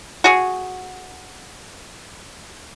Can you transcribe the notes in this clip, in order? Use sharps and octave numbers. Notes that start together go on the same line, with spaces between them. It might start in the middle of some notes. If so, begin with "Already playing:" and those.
F#4 G#4